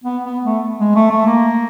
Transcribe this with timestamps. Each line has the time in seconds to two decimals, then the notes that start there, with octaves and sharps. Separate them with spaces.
0.04 B3
0.24 B3
0.44 A3
0.80 G#3
0.95 A3
1.11 A3
1.26 A#3